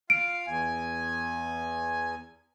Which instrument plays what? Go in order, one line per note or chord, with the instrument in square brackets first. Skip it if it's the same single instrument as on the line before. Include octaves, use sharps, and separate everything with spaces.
[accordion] F4 F5 [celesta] D7
[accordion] E2 G#5